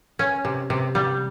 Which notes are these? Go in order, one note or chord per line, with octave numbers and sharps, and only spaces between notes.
C#4
C3
C3
G3